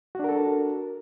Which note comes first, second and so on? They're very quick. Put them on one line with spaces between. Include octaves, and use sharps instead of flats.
F#4 D4 A#4 A4